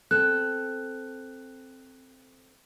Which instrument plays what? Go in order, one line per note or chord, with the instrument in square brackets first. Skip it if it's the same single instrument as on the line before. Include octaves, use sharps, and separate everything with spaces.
[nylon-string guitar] C4 A4 [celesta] F#6